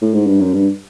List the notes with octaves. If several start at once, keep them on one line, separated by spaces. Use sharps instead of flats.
A2
G#2
G2
F#2
G2